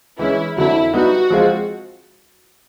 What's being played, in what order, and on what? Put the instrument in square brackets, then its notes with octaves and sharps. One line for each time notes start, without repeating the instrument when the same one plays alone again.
[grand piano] E3 G#3 C#4 [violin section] E4
[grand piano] F2 D3 F#3 [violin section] E4
[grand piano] G3 B3 D#4 [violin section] F#4
[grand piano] F3 G#3 C4 F4